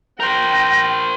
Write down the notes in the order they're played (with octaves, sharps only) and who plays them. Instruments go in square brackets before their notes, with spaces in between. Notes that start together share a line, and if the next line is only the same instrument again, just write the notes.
[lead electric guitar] A#4 C5 [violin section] G5 [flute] A#6